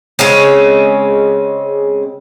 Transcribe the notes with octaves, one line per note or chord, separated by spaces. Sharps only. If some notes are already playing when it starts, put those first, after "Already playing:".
C#3 G#3 C4 C#4